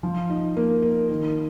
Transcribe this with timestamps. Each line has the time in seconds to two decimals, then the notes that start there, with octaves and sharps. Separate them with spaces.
0.03 F3
0.29 D#4
0.56 A#3
0.82 A#4
1.09 D#3